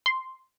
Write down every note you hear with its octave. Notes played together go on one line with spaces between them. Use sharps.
C6